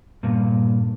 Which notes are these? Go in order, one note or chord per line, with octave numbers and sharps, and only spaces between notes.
G2 A#2